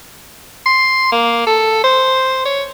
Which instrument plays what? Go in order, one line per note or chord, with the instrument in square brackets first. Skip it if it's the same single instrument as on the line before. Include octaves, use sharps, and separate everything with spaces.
[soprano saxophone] C6
A#3
A4
C5
C#5